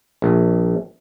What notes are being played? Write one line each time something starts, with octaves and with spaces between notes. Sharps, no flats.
A#1